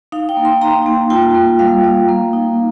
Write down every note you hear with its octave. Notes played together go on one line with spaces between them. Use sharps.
D#4 F5
G5
A#3
C6
D#4 A#5
A#3
F4 G5
A#3
G3 F5
A#3
A#3
D#4